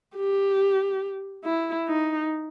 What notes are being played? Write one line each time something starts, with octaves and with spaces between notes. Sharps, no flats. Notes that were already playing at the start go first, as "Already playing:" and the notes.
G4
E4
D#4